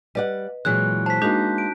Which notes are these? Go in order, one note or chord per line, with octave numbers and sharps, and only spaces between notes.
G3 B4 D5 D#5 F#5
A#2 E3 F#3 G#3 G#4 F#6
C5 A5 B6
G#3 A#3 D4 D#4 F#4 G6
D7